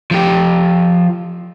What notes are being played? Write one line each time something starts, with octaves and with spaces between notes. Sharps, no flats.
F3 G4